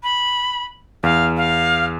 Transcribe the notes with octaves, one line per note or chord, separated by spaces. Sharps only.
B5
E2 F5
F5